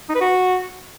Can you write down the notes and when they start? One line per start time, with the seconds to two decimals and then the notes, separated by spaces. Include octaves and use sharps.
0.09 D#4
0.15 B4
0.21 F#4